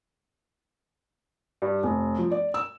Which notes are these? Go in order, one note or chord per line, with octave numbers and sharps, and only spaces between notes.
G2
F1
F3
D5
E6